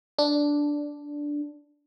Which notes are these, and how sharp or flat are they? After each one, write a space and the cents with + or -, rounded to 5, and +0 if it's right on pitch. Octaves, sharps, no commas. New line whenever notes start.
D4 -5